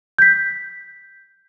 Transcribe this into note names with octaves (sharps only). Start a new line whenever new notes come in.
G6 B6